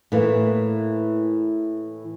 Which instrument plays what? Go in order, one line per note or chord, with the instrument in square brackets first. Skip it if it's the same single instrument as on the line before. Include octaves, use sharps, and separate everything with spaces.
[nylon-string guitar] A2 E3 A#3